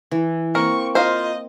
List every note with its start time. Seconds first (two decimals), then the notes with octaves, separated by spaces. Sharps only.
0.11 E3
0.55 A#3 C4 A#4 C#6
0.95 F4 A#4 C5 D#5